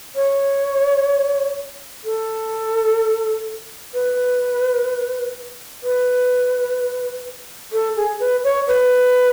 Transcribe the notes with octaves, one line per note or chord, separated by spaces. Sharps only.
C#5
A4
B4
B4
A4
G#4
B4
C#5
B4